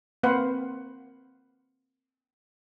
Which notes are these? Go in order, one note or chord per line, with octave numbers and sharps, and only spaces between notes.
A#3 C4 B4 C5 F5 F#5